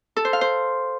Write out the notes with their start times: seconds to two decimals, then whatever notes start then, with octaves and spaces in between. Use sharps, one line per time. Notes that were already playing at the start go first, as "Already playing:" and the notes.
0.16 A4
0.25 C5
0.33 F5
0.41 C5